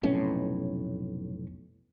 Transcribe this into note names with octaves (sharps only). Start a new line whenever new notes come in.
F1 B1 A2 C#4